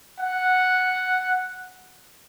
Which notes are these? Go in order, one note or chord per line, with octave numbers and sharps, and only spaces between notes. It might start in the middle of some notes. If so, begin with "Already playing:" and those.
F#5